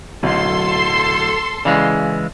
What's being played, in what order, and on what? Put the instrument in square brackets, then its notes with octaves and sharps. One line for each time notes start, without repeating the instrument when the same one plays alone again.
[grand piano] D1 B1 [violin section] A4 C6
[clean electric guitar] C#3 E3 G#3 [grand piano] D5 F5